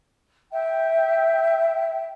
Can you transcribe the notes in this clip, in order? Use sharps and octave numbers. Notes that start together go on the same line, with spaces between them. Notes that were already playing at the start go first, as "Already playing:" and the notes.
E5 G5